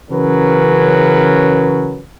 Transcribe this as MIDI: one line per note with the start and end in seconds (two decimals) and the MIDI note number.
0.11 1.99 49
0.11 1.99 52
0.11 1.99 54
0.11 1.99 61
0.11 1.99 70
0.11 1.99 71